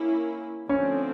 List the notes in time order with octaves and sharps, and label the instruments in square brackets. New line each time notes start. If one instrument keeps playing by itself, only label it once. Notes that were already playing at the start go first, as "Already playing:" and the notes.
Already playing: [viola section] A#3 C#4 E4
[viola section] D3 F3 A3 C4 [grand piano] C#4